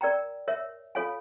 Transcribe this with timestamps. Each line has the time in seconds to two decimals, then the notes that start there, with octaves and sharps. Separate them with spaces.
0.01 A#4 D5 G5 A#5
0.48 A#4 C#5 E5
0.95 F4 A4 C#5 F5 G#5